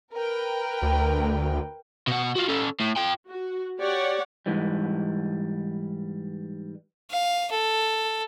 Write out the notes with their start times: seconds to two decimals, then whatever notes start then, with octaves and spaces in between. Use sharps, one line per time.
0.14 A#4 B4 G5
0.82 D2
2.07 B2 F#5
2.35 F4 F#4
2.49 C#4 A4
2.80 A2
2.97 F4 G5
3.28 F#4
3.80 G4 C#5 D5 F#5
4.46 G#2 E3 G3
7.10 F5
7.51 A4